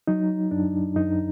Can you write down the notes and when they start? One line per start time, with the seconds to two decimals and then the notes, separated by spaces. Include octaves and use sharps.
0.07 F#3 D#4
0.51 F#2 D4
0.96 F#2 D#4